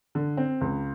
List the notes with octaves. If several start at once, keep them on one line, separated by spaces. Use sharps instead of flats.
D3
C4
C#2